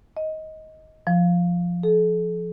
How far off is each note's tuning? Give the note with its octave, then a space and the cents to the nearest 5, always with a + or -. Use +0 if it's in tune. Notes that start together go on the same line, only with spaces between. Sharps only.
D#5 +15
F3 +0
A4 -40